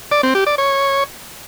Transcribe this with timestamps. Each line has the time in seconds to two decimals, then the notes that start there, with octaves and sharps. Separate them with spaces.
0.12 D5
0.23 C4
0.35 G4
0.47 D5
0.58 C#5